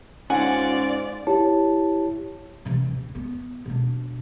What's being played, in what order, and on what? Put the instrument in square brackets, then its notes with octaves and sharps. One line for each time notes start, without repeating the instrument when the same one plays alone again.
[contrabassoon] G#2 [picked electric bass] C#4 [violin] F4 D5 [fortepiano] F#5 G#5
[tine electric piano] E4 G4 C#5 A5
[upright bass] C3 E3
D1
B3
B2 D4